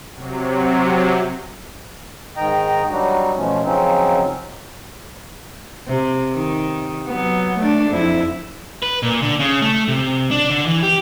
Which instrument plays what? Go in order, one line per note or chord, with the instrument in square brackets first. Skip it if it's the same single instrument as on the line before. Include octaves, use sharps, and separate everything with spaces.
[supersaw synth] C3 F#3
[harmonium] G#2 D#3 D#5 G5 A#5
F#3 G3 D4 D#4 F#4
B2 F3 A3 C#4
C#3 F3 F#3 C4 C#4 D#4
[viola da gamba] C3
D#3
F#3 B3
A3 D4
F2 E4
[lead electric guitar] B4
A#2
D3
C#3
A3
C3
D4
D3
E3
G4